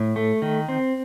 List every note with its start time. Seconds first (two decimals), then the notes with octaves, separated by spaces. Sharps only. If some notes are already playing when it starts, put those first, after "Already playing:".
Already playing: A2
0.16 A3
0.42 D#3
0.68 C4